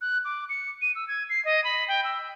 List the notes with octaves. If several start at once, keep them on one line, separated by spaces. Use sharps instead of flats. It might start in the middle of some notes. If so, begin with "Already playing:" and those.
F#6
D6
C#7
D#7
E6
G#6
C7
D#5
B5
G5
E6